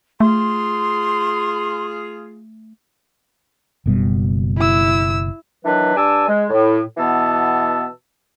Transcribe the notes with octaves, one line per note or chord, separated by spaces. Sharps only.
A3 F4 G#4 C6
F#1 B2 G3
E4 E6
D#3 E3 F#3 D4 B4
G2 D4 G#5 A5 E6
G#3
A2
B2 E3 B3 A5 E6